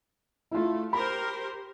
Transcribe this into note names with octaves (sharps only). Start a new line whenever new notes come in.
A3 E4 F4
G4 A#4 C5 B5